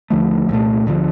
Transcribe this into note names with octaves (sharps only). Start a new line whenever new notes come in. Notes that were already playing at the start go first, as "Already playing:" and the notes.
D#2 D3 F3 A3
C2 A#2 A3
D2 D3 F3